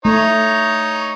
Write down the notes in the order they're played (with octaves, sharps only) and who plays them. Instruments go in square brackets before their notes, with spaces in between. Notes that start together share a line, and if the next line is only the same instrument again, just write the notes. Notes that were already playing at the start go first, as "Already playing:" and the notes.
[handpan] A3 [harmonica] D#4 C#5